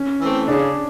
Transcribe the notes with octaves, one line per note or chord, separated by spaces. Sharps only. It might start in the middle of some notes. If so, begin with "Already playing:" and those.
Already playing: C#4
E3 A3 C4
C#3 D4